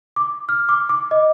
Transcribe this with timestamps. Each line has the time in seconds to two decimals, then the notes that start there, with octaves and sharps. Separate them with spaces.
0.16 D6
0.49 F6
0.69 D6
0.89 D6
1.11 D#5